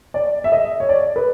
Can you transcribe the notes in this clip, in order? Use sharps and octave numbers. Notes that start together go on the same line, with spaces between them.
D5
E5
D#5
C#5
D5
B4